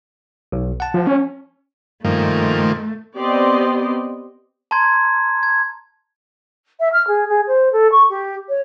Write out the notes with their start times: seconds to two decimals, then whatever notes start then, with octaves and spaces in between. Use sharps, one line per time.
0.52 B1
0.80 F#5 A5
0.94 F3
1.07 C#4
2.05 G2 A#2 D#3 F3 A3
3.17 B3 C4 G4 D5 D#5 C6
4.71 A5 A#5 C6 G#6
5.43 G#6
6.80 E5
6.93 F6
7.08 G#4
7.29 G#4
7.47 C5
7.72 A4
7.92 C#6
8.10 G4
8.49 C#5